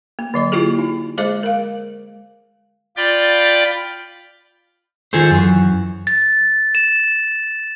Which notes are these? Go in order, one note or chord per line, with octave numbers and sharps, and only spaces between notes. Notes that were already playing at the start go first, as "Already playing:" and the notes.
A#3
D3 F#3 D#5
A#3 E4 F4 G4 G#4
D#4
G#3 G#4 C5 D#5 D6
A#4 F5
F4 D5 G5 B5 A6
D#3 F4 G#4 A4 C5
F#2 E3
A6
E7